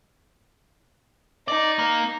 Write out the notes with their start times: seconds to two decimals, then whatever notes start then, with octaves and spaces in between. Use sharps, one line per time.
1.48 D#4 D5
1.79 A#3